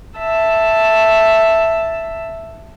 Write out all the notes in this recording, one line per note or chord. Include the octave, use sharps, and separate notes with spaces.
E5 A5